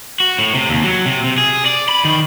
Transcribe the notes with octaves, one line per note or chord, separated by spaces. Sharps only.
F#4
A2
C3
D#2
F#3
C3
C3
G#4
D5
B5
D#3